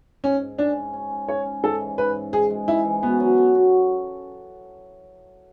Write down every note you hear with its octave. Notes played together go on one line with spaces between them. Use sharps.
G#2 C#4
G#2
C#4 D4
G#2
C#4
C#4
C#4 C#5
C#4
G#2 A4
E3
G#2 B4
G#2
G#2 G#4
G#3
G#3 E4
E3
B3 F#4
F#3
A4
F#4